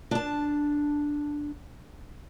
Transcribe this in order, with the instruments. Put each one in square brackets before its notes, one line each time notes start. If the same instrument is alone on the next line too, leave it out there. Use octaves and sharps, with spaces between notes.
[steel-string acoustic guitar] D4 A5